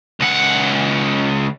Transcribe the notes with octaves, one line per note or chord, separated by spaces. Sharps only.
C#2 F#5